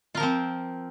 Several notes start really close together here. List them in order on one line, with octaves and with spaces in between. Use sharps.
F4 A#4 F3 C4